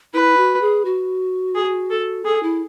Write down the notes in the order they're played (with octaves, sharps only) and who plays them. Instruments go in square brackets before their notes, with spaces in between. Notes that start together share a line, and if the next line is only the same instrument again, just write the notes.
[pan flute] E4 [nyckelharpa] B4
[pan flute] F#4
G#4
F#4
[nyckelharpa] G#4
A4
[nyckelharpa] G#4 [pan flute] A4
[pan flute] E4